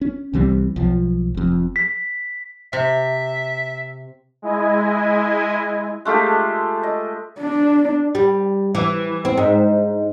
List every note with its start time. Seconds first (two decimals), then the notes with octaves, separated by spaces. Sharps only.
0.01 C#4
0.33 C2 E3 G3 C4
0.76 B1 F3
1.35 F1 F2
1.76 B6
2.73 C3 E5
4.42 G#3 E4 D#5 G#5
6.05 G#3 A3 F4 G4
6.83 D#5
7.40 D4
8.15 G3
8.75 E3
9.25 C4
9.37 G#2